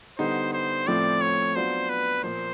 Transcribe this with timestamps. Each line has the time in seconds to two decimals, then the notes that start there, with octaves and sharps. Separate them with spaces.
0.19 D3 G3 B3 D#4 C5
0.53 C5
0.87 A2 F3 A3 C4 D5
1.21 C#5
1.55 F#3 B3 D4 F4 C5
1.89 B4
2.23 A#2 F3 A#3 C5